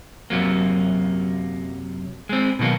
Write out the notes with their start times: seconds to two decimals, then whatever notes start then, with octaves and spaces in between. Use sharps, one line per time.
0.30 F#2 C3 F#3 A#3
2.29 G#3 C4
2.59 B2 D#3 F#3 A#3